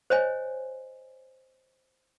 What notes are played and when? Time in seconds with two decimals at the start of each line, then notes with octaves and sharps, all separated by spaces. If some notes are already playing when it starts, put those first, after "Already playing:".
0.10 C5 C#5 D#5 G#5